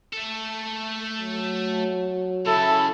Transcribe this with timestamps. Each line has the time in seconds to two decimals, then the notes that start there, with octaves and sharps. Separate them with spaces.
0.13 A3 A4
1.19 F#3
2.46 C#3 E4 A4